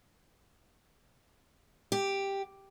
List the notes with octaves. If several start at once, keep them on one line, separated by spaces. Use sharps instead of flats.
G4